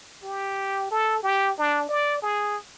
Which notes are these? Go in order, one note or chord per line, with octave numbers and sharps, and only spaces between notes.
G4
A4
G4
D4
D5
G#4